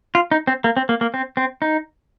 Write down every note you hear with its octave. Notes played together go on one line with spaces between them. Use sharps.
F4
D#4
C4
A#3
C4
A#3
A#3
C4
C4
D#4